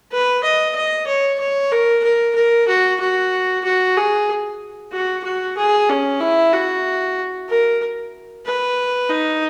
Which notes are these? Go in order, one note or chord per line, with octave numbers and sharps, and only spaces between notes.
B4
D#5
D#5
C#5
C#5
A#4
A#4
A#4
F#4
F#4
F#4
G#4
F#4
F#4
G#4
C#4
E4
F#4
A#4
B4
D#4